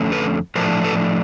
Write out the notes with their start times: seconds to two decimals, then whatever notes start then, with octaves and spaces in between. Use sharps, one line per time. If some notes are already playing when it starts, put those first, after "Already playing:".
Already playing: F2 D3 A3 C#4
0.12 A4 B4
0.55 A2 F3 A3 D4 A#4 C5
0.84 A4 B4